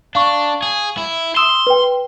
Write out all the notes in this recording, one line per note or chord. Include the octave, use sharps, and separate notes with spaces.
D4 F5 C#6
G#4
E4
C6 D#6 E6 E7
B4 G5